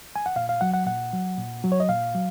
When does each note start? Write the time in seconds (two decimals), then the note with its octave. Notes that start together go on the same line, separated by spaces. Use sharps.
0.16 G#5
0.26 F#5
0.36 A#2 F5
0.49 F5
0.61 F#3 F#5
0.74 F#5
0.86 A#2 F#5
1.13 F#3
1.38 A#2
1.64 F#3
1.72 C#5
1.80 D#5
1.89 A#2 F5
2.15 F#3